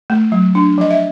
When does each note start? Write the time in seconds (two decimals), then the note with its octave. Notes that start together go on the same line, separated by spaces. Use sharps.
0.10 A3
0.32 F#3
0.55 D4
0.78 F3 D#5
0.91 E5